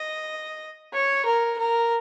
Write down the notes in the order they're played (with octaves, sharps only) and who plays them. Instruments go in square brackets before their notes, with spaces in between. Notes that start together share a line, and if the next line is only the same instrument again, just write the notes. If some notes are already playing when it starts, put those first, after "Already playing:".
Already playing: [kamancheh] D#5
C#5
A#4
A#4